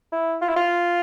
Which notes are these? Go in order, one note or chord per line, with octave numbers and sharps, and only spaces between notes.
E4
F4
E4
F4